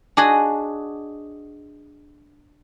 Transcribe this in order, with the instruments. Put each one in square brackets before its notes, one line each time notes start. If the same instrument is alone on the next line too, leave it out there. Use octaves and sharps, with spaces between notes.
[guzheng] D4 F#4 G#4 D#5